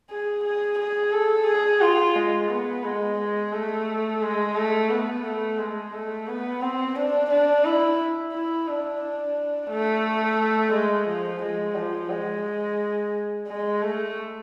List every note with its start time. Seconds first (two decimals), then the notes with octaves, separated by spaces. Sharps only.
0.10 G#4
0.44 G#4
0.79 G#4
1.12 A4
1.47 G#4
1.81 F4
2.16 G#3
2.49 B3
2.84 G#3
3.18 G#3
3.53 A3
4.22 G#3
4.55 A3
4.90 B3
5.24 A3
5.58 G#3
5.93 A3
6.28 B3
6.61 C4
6.96 D4
7.30 D4
7.65 E4
8.33 E4
8.68 D4
9.70 A3
10.73 G#3
11.08 F3
11.42 G#3
11.76 F3
12.10 G#3
13.47 G#3
13.82 A3